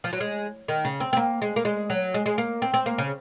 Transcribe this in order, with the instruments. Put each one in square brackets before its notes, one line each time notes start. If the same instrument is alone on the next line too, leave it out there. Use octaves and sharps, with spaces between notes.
[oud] F3
F#3
G#3
D#3
C#3
C4
C4
A#3
G#3
A#3
G#3
F#3
G#3
G#3
A#3
C4
C4
A#3
C#3